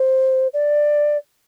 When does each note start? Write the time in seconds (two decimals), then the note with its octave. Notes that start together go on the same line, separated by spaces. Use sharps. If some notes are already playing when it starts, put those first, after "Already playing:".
Already playing: C5
0.53 D5